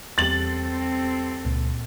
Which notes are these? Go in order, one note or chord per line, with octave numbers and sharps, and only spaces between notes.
E2 G3 C4 G4 A4 A6 F#7
C#2 A#2